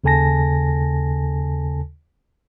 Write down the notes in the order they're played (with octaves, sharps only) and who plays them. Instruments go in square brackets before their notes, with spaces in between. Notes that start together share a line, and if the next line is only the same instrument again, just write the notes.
[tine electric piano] D#2 C#3 A4 G#5 A5 A#6